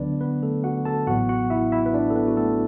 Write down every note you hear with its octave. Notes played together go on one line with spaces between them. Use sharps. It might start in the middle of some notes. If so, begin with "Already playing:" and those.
Already playing: D2 D3 F#3 B3 D4 B4 D5
B3 B4
A3 A4
F#4 F#5
A4 A5
A1 A2 F#3 B3 F#4 F#5
F#4 F#5
E4 E5
E4 E5
B4
D4 D5
A4
B3 B4
F#4
A3 A4